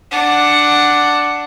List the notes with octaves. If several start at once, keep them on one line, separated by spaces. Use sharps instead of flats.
D4 F#5